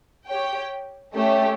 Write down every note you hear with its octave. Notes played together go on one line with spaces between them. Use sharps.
G4 C#5 G5
A3 C#4 G4